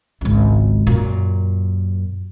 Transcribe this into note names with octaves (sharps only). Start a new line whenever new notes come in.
G#1 C#2
F#2 A#2